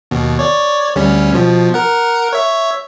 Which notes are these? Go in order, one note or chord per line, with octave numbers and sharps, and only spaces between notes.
D#2 B2
C#5 D5
D2 G3 C#4
B2 F3
A#4 F#5
C#5 E5